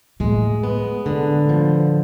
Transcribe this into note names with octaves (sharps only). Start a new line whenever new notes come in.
A2 G#3
B3
D3
F3